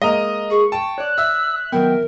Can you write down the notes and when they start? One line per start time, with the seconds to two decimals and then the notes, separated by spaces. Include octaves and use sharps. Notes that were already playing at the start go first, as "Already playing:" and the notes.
0.02 G#3 A#3 D#5 A#5
0.50 G#4 C#6
0.72 G5 A5
0.98 C#5 D5 F#6
1.18 E5 E6
1.72 D#3 F#3 B3 A#4 G5